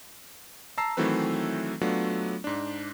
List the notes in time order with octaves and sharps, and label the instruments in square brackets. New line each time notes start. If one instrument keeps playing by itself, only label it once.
[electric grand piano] A5 A#5 E6 C7
D#3 E3 F#3 A3 C4 B4
F#3 A3 B3 D4 F4
G#2 D4